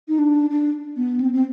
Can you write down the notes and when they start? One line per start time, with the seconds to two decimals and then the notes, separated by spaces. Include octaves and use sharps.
0.08 D#4
0.19 D4
0.50 D4
0.97 B3
1.21 C4
1.33 C4